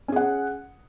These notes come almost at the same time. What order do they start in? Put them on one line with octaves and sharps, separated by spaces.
C#4 G#4 F#5